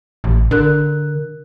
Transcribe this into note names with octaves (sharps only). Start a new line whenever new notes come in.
A1
D3 A#4 F#6